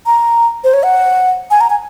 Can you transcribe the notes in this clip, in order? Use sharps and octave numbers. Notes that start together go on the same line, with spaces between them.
A#5
C5
C#5
F#5
G#5
A#5
G#5